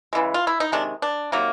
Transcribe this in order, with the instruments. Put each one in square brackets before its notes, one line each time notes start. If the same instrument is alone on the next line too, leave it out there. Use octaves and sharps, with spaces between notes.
[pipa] C#3 E3 G#3
F4
E4
D#4
C3 D#3 G#3 D4
D4
C3 D#3 F#3 A#3